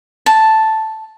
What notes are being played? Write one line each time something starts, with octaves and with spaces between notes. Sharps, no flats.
A5